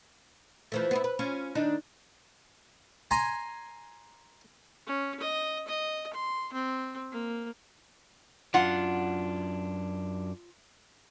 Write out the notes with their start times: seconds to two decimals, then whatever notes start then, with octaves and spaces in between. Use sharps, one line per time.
0.72 E3 F3 A3
0.91 B3 C4 E4
1.04 B4
1.19 C#4 F4
1.55 D#3 D4 D#4
3.11 G#5 A#5 C6
4.87 C#4
5.21 D#5
5.68 D#5
6.14 C6
6.53 C4
7.12 A#3
8.54 F#2 D4 F4 F#5